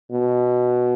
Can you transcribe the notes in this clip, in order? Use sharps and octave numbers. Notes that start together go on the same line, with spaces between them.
B2